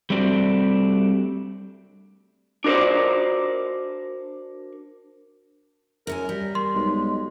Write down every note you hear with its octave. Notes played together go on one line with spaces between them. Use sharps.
G3 A3 C4 D4 F#4
D4 F#4 A#4 C5 D5
F#2 F#3 A#4 G#5
G3
C6
B1 G#3